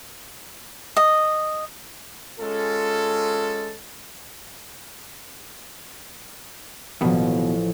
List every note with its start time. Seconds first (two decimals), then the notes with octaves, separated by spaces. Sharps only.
0.97 D#5
2.39 G#3 C#4 F4 A4
7.01 A1 D#2 B2 F3